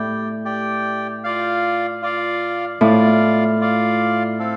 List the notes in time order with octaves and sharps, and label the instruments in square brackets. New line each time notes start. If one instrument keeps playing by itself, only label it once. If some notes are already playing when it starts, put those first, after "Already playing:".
Already playing: [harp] A2 [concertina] G4 D5 G5
[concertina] G4 D5 G5
F4 D5 F5
F4 D5 F5
[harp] A2 [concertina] F4 D5 F5
[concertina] F4 D5 F5
C4 A4 F5